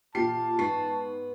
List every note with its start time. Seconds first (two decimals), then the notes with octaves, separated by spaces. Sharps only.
0.15 A#2 F4 G4 A5 C7
0.59 G#2 B3 C#6 C7